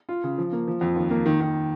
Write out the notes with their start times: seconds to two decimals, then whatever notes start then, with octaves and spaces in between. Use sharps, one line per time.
0.09 F4
0.24 C#3
0.38 F3
0.52 A#3
0.68 F3
0.81 F2
0.96 D#2
1.11 A#3
1.26 D#3
1.40 D#3